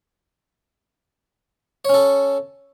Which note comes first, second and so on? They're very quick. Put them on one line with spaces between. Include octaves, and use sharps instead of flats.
C#5 C#4 A4